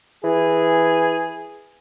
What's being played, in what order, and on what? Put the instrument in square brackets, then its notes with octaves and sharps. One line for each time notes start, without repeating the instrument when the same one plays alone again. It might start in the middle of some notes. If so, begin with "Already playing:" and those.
[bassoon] E3 [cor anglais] G#4